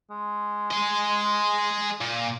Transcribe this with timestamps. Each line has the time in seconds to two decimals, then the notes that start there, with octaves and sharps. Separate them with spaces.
0.10 G#3
0.71 G#4 D#5
2.01 A#2